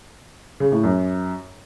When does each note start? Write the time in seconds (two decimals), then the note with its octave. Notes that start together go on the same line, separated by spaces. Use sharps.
0.60 C#3
0.72 A2
0.83 F#2